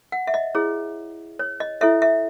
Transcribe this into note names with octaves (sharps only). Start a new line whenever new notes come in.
F#5
E5
D#5
E4 G#4 C#5
C#5
D#5
E4 A4 C#5 E5
E5